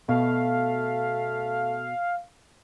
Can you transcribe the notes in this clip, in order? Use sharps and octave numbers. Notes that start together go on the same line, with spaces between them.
B2 A3 F5